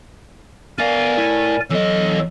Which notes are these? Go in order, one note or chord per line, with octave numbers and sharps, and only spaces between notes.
B3 A#4 D5 F5 G#5
A2 E4
E2 F#3 A4 D#5